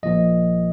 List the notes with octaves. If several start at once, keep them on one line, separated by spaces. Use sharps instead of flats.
A#1 A#2 F3 D#5